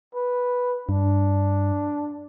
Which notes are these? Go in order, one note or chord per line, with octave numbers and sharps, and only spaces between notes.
B4
G2 D4